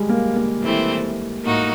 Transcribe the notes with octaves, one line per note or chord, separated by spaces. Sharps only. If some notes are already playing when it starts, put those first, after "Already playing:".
Already playing: G3 G#3
A#3
A#3
E3 A3 C4 E4
A2 A#3 D#4 F#4